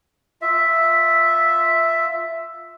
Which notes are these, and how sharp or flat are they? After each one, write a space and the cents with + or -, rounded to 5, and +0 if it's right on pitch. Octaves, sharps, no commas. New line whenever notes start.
F4 +0 E5 +0